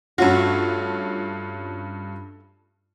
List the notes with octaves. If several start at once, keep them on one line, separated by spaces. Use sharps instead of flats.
G2 A3 C#4 F4 F#4